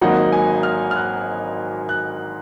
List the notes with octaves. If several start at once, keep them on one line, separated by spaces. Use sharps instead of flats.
G#1 G#2 F#3 A#3 D#4 F#5
G#5
F6
F6
F#6
F#6